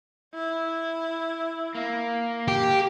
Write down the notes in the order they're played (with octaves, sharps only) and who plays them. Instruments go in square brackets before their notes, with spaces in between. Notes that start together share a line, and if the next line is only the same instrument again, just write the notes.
[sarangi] E4
[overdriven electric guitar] A#3
[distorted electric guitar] G4